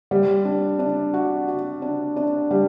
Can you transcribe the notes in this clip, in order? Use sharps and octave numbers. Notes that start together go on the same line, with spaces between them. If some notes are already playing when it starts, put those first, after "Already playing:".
G3
D4
D4
F#4
F#4
D4
D4
G3